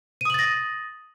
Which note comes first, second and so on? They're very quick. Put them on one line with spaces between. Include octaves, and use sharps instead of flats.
D#7 D#6 F#7 A6 A#6